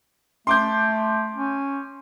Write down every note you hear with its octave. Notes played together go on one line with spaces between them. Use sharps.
A3 C6 D6 G6
C#4